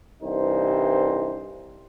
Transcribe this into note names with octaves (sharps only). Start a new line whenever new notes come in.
C2 G2 E3 D#4 C5